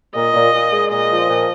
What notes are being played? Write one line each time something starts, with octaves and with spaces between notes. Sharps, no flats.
A#2 D#5
A#2
A#2
G#3
A#2 D#5
F3
A#2